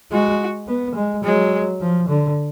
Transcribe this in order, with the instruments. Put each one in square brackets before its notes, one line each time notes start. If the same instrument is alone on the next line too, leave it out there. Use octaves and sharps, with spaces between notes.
[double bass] G#3 [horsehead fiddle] F#4
[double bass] B3
G#3
[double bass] F#3 [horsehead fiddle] G#3
[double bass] F3
D3